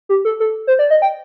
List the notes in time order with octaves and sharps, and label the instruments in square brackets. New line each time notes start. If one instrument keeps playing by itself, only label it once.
[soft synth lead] G4
A4
A4
C5
D5
D#5
G5